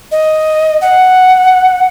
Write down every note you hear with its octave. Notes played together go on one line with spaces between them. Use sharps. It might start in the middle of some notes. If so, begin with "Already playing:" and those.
D#5
F#5